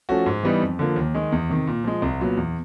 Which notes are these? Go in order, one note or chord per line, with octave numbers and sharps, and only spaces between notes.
F3 A3 C#4 F#4
G#2
E3 G3 B3 D#4
F2
D3 F3 A#3
D#2
D#3 G#3
E2
C3 D#3
A#2
F3 G#3
C2
A#2 F#3 B3
E2